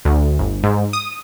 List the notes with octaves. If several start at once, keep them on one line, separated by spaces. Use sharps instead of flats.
D2
G1
G#2
D#6